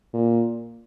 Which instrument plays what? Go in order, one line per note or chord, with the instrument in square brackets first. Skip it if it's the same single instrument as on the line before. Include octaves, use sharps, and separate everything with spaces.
[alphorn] A#2